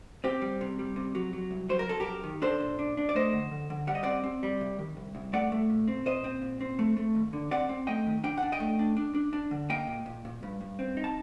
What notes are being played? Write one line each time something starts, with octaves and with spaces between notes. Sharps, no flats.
C4 G4
G3
C3
G3
C3
F#3
F#3
C2
F#3 C5
A#4
F#3 A4
G4 A#4
F#2
D#3
D4 A4 C5
A#2
D4
D4
D5
A3 C5 D#5
D3
D3
D3
G3 F#5
D#5
C4 D5 F#5
C4
G3
C3
D#3
C2
C2
A3 D5 F#5
A3
A#2
C4
A#2 C5 D#5
C4
A#2
C4
A3
A3
D#2
D3
C4 D5 F#5
C4
A3 D#5 G5
D#3
D4 G5
D4 F#5
D#5 G5
A3
D4
D4
D4
D4
D3
A#3 D#5 G5
A#2
A#2
A#2
G2
G2
C4
D#4
A5